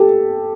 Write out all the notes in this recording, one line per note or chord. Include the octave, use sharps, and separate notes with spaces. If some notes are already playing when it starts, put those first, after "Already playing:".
Already playing: G4 A4